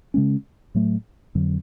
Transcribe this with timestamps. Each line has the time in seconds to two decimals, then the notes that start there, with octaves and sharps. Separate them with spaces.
0.14 C#3 G#3 C#4
0.75 A2 F#3 A3
1.35 F2 D3 F#3